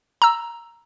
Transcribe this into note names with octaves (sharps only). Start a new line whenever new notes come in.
A#5 E6